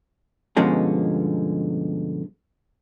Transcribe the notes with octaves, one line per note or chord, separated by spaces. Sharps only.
G2 B2 D3 F3 G#3 C#4